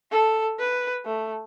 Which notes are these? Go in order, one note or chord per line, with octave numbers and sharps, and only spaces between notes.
A4
B4
A3